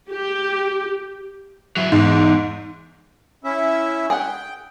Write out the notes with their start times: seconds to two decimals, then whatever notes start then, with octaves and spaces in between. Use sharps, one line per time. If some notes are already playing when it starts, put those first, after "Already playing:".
0.10 G4
1.77 F#3 E4
1.92 E2 G#2
3.44 C#4 E4 E5
4.10 G#4 F#5 G5